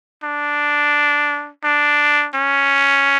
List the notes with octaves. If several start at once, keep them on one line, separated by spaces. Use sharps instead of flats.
D4
D4
C#4